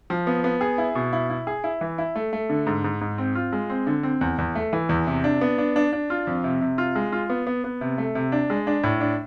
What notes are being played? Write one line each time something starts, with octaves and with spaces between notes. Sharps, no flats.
F3
B3
B3
G#4
E4
B2
E4
E4
G#4
E4
E3
E4
A3
A3
D3
G#2
G#2
G#2
C4
F4
G#3
C4
D3
C4
E2
E2
A3
E3
E2
C3
D4
B3
D4
D4
D4
F4
F2
C3
C3
F4
G#3
F4
B3
B3
B3
C3
A3
C3
D4
G#3
D4
A2
D4